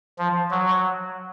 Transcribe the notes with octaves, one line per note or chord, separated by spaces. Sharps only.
F3
F#3